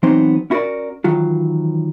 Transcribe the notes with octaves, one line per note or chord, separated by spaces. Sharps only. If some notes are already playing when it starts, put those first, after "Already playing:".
E3 F#3 B3 C4 D#4 C5
C#4 E4 F#4 G#4 A#4 D5
D#3 E3 F#3 F4